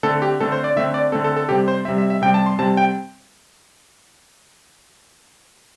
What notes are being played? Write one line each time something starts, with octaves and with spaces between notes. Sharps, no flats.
D3 A3 C4 A4
G4
D3 A3 C4 A4
C5
D5
D3 A3 C4 E5
D5
D3 A3 C4 A4
A4
A4
C3 G3 C4 G4
C5
C3 G3 C4 E5
E5
E5
C3 G3 C4 G5
A5
C6
C3 G3 C4 A5
G5